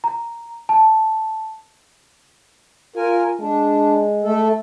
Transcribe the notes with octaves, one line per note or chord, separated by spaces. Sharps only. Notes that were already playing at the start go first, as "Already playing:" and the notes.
A#5
A5
F4 A#4 G#5
G#3 D4
A3 A4